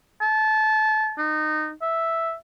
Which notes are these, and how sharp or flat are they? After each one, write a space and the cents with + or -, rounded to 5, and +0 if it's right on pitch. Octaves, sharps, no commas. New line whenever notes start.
A5 -25
D#4 -20
E5 +0